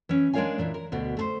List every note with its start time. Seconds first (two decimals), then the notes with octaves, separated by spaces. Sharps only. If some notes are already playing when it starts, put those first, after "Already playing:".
0.09 E3 C#4
0.33 G#3 D4 A#4 C#5 F5 G#5
0.58 A#2 E3 D4
0.74 A#4
0.92 D2 B2 B3
1.17 A3 A4 C5